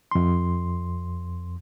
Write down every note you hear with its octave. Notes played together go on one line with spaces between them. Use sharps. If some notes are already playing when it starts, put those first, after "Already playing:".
F2 C6